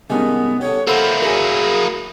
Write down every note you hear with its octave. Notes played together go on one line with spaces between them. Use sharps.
G2 C3 D#3 G#3 B3 C#4 D#4
D3 G4 C#5
A#3 E4 A4 C5 F#5
F#3 G#4 A#4 G#5